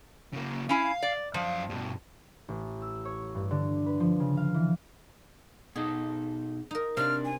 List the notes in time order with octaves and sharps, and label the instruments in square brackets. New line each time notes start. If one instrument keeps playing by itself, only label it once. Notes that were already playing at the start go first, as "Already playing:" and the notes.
[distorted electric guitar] C#3 A#3
[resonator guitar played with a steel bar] C#4 E4 G#5 [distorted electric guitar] F5
[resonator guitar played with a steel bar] D5
[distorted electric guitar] F#2 F5 [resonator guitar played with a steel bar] F3
[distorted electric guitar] G2 B2
[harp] A1
E6
C#5
G2
D3
B4
F3
C#3
F5
E3
[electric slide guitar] B2 D#4 A4 [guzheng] G#4
[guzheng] D#4 A#4
[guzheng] C3 [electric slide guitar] C4 D4 [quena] F6
[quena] G#5